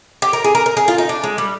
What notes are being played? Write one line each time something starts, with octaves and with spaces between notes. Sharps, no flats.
G4
A#4
G#4
A#4
A#4
G#4
F4
D#4
D4
G#3
G3